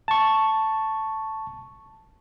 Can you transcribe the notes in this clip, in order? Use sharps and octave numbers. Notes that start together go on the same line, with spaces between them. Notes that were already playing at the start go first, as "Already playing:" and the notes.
A5 C#6